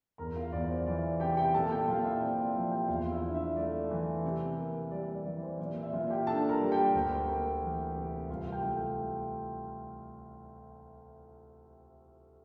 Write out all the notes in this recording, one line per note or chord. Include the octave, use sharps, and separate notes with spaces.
E2 A#4 A#5
F4 F5
E2 D5
C5
E3 D5
C3 G4 G5
G4 G5
A#2 A4 A5
G4 G5
A#2 F4 F5
E4 E5
C4 D5
D5
F3
G4 G5
E2 F4 F5
E4 E5
D4
E4 E5
A3 D5
E3
C3
A#3
G3 D5
D5
E3 D5
C5
A#2 D5
E5
A#2 F4 F5
G4 G5
D4 A4 A5
A#4 A#5
G3
G4 G5
D2
A#3
E3
C3
C2 F4 F5
G4 G5
A3